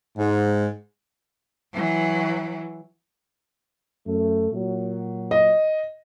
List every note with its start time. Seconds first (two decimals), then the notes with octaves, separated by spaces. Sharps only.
0.16 G#2
1.73 E3 F#3
4.06 F#2 A3
4.52 A#2 F#3
5.31 D#5